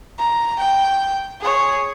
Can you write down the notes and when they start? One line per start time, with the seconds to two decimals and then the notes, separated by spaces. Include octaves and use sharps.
0.18 A#5
0.59 G5
1.41 G#4 C#5